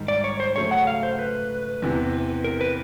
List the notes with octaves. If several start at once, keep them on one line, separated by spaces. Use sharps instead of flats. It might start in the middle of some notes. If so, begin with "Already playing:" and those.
Already playing: G#2 D#3 G3
D5
C#5
C5
C#3 F#3 A3 C#5
F#5
F5
C5
B4
E2 C3 E3
A#4
B4